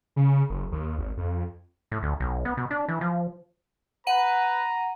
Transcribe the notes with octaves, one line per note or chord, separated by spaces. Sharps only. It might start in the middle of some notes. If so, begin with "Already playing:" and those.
C#3
F#1
D#2
G#1
F2
A2
D2
B1
B3
B2
D4
E3
F3
B4 F#5 A#5 D#7